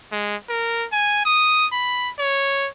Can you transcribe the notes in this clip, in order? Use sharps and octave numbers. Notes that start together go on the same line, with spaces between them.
G#3
A#4
G#5
D#6
B5
C#5